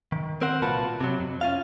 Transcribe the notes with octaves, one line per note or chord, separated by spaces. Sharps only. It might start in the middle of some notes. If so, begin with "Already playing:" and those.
D#3
C4 A#4 C5 F#5
C2 A#2 F4 F#4 B4 A5
C3 F#3
F2
C#4 F4 F5